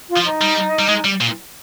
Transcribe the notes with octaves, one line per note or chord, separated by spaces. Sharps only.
F4
F3
D#4
G3
G3
G#3
G3
A#2